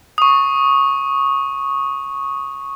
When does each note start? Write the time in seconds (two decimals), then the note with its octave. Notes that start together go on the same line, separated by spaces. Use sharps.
0.18 C#6 D#6